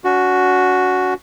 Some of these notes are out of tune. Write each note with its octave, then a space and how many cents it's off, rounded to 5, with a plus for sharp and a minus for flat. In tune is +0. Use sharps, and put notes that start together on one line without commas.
C#4 +45 F#4 +0